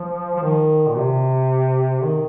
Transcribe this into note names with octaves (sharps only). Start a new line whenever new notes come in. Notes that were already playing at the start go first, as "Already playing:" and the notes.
Already playing: F3
F3
D#3
A#2
C3
D#3